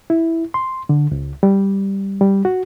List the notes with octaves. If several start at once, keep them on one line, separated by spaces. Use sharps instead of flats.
E4
C6
D3
C#2
G3
G3
F#4